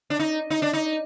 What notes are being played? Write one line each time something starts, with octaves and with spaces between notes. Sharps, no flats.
D4
D#4
D#4
D4
D#4